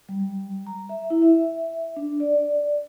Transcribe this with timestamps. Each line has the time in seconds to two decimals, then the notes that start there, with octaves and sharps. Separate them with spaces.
0.09 G3
0.67 A#5
0.89 E5
1.10 E4
1.22 E5
1.96 D4
2.20 D5